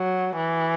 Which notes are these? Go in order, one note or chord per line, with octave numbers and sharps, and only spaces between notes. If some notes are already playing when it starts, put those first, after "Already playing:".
Already playing: F#3
E3